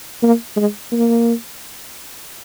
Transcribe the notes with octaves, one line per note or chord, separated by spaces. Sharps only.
A#3
G#3
A#3